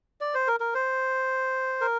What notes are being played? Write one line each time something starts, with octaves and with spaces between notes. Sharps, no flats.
D5
C5
A#4
A#4
C5
A#4